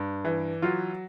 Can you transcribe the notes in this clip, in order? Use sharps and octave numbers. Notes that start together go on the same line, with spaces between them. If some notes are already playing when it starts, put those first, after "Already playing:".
Already playing: G2
E3
F#3 F4